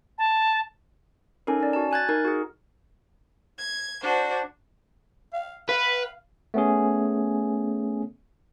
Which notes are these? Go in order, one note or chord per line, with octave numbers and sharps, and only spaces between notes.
A5
C#4 D#4 A4 A#4
C#4 D5
F#4 A5
G#5 F#6 G#6 A6
D#4 A#4
F#4 G#4
G#6
D4 F#4 C5
F5
B4 F5
A3 B3 C#4 G#4